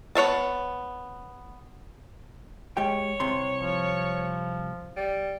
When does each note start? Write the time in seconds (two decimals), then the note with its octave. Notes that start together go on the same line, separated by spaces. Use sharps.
0.15 B3 C#5 E5 A5
2.77 G#3 G4 C#5 G5
3.20 C2 C3 C6
3.57 F3
4.96 G3